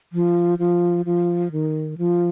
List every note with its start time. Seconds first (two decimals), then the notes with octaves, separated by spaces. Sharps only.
0.13 F3
0.59 F3
1.05 F3
1.52 D#3
1.98 F3